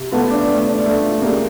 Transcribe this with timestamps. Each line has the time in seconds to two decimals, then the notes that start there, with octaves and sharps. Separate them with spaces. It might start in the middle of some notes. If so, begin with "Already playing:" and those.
Already playing: C3
0.11 A3 B3 F4
0.30 D4
0.48 A3
0.68 D4
0.86 A3
1.04 F4
1.22 G#3 A#3 G4